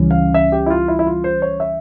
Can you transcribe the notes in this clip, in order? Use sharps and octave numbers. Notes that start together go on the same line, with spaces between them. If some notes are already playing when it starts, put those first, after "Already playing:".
Already playing: C#2 C#3 E3 G3 C#4
F5
E5
G4
E4
F4
E4
E4
F4
C5
C#5
E5